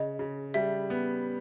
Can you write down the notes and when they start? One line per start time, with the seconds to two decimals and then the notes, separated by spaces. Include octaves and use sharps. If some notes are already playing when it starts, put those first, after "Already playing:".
Already playing: C#3 D#5
0.19 C#3
0.54 G3 E5
0.90 B3